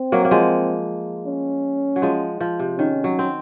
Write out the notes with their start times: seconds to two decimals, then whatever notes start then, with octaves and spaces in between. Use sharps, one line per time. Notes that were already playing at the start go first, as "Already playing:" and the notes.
Already playing: C4
0.12 F#3 A#3
0.25 A#3
0.31 F3 G#3
1.26 C#4
1.96 F#3
2.02 F3 G#3
2.40 F3
2.59 C3
2.78 D#3 C#4
3.04 F#3
3.19 C4